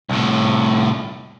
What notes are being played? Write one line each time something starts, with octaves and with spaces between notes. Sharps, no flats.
C2 A2